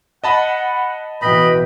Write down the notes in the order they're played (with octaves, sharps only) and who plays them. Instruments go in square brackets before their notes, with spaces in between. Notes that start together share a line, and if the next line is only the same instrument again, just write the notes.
[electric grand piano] D#5 A5 B5 [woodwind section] F#5
[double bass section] B2 E3 [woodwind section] B4 G5 [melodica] D#5 B5